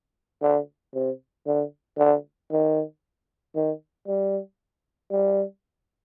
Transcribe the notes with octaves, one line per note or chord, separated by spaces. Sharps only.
D3
C3
D3
D3
D#3
D#3
G3
G3